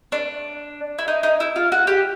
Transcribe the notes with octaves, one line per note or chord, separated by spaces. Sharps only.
D4
E4
D#4
D#4
E4
F4
F#4
G4